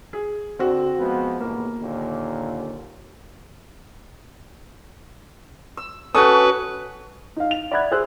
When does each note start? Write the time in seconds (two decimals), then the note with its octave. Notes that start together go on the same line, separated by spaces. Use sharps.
0.13 G#4
0.59 D3 C4 F#4
0.99 F3 G#3 B3
1.40 A1 G#2 B2 A#3
1.82 D#2 A#2 D3
5.77 E6
6.15 C#4 F#4 A4 B4 D#6
7.36 D#4 F5
7.51 F7
7.71 D5 E5 F#5 B5 F#6 G#6
7.91 G#4 C5 E6 F#6